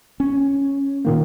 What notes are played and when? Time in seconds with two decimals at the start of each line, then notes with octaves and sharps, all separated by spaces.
0.20 C#4
1.05 A#2 D#3 A#3